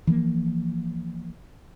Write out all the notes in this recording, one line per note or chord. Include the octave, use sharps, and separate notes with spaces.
E3 F3 A3 A#3